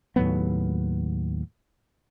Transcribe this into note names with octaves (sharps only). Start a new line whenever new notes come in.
D#2 A2 F#3 B3